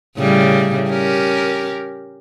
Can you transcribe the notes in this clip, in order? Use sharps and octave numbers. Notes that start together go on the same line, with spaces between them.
A2 C#3 G3
C#4 G4 A#4